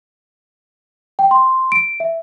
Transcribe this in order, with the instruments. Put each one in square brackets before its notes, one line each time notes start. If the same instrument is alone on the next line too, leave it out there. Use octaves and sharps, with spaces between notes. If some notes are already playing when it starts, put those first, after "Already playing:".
[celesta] G5
C6
D7
E5